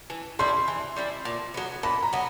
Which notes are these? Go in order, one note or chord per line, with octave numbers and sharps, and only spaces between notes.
E3
G3 C4 E4 C6
E3
G3 C4 E4
A#2
F#3 B3
A#2 B5
A#5
F#3 B3